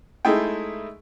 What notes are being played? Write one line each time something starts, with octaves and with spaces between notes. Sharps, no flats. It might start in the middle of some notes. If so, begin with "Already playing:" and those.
G#3 A3 D#4 E4 G#4 G5